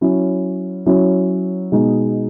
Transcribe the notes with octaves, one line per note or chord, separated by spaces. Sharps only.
F#3 C#4 E4
F#3 C#4 E4
B2 G#3 D#4